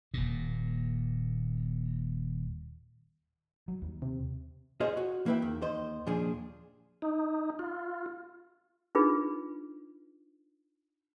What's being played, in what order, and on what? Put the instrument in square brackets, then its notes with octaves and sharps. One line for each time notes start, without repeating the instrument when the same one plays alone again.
[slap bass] D#1 A#2
[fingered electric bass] F#3
D#2
[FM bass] C3
[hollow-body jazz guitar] F4 G#4 C5 C#5 D#5
F#4
E3 A#3 E4 B4 E5 G5
E2 D#3
D#2 D#3 C5 D#5
D#2 A#2 F3 D4 G#4
[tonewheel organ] D#4
F4
[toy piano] D4 D#4 F4 G#4 B4